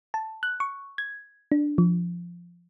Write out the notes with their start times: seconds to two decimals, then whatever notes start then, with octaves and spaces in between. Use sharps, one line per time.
0.14 A5
0.43 F#6
0.60 C#6
0.98 G#6
1.52 D4
1.78 F3